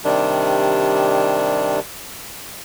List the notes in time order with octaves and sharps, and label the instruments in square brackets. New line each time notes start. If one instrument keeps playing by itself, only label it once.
[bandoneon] C3 D#3 G3 D4